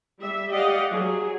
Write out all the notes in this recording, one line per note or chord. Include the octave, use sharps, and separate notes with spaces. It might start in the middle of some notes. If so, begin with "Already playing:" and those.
G3 E5
G4 D5 D#5 F5 F#5
F#3 G#4